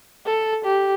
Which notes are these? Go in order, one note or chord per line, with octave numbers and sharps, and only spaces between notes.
A4
G4